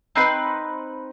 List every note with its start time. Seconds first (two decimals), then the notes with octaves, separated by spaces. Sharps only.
0.16 C4 D#4 B4 C6